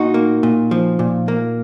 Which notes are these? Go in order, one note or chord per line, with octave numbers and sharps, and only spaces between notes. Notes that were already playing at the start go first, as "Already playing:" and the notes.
Already playing: A#2 D#4 F#4
A#3
A#2
F3
A#2
A#3